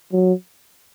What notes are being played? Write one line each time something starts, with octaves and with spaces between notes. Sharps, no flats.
F#3